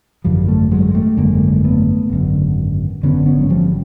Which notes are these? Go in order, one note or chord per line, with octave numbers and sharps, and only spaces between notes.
G#1 F#2 D3 F3 G3
G3 A3
F#3 G#3
G3 A3
G#1 F#2 D3 G#3 A#3
A3 B3
G#1 F#2 D3
G#1 F#2 D3 B3 C#4
B3 C#4
F#3
F3 G3